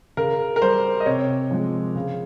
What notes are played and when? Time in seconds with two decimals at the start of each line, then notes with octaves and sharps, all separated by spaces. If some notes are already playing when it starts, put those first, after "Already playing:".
0.17 C#3 A#4
0.56 A#4
0.62 G3 C5
1.00 D#5
1.06 C3 C#5
1.51 F3 G#3
1.95 C#3